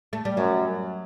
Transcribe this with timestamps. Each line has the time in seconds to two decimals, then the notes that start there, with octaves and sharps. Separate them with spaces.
0.13 A3
0.25 G3
0.37 F#2 F#3